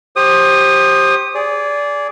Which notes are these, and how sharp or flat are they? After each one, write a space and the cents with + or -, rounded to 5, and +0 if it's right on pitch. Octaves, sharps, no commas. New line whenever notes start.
G4 +0 C5 +25 D#6 -15
G#4 +0 D5 -20